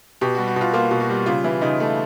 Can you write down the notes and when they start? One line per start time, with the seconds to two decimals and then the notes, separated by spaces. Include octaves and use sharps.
0.21 B2 G4
0.35 G3 F#4
0.48 F#4
0.56 B2 F4
0.73 A#3 F4
0.91 B2
1.00 F#4
1.10 G3
1.26 C#3 F4
1.44 E3 E4
1.62 C#3 D#4
1.80 A3